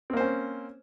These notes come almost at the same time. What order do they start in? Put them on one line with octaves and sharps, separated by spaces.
C4 A#3 C5 C#4